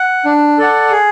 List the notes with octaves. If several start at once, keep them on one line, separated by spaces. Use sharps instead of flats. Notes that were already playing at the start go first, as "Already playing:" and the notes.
Already playing: F#5
D4
A4 D5 F#5
G#4